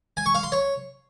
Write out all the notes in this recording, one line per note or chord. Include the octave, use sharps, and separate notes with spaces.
G#5
C#6
F5
C6
C#5